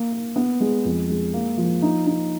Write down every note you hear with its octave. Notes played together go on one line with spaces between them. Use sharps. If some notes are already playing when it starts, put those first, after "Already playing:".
Already playing: A#3
A#3
B3
G#3
F2
G#3
A#3
F3
D#4
D#4